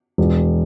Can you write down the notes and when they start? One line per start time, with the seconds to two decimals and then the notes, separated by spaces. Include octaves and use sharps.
0.18 E1